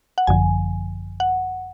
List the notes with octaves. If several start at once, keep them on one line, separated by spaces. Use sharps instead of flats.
F#5
G#1 F#2 D3 F3 G#5
F#5